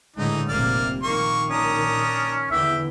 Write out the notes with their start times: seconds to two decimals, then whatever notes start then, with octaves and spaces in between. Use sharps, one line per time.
0.16 A2 D3 E3 G#3 D#4
0.49 F1 A#1 C3 A#3 D5 F6
1.03 A#1 D#3 A#3 C#6
1.50 C#4 D4 A#5 D#6
2.51 E2 D3 E3 G4 E5 G5